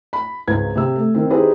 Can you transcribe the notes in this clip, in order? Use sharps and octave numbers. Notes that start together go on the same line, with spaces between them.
B5
G#1 C#2 B4 G#6
C3 G4 E6
A3
D#3 C4
D#4 E4 G4 G#4 B4 C5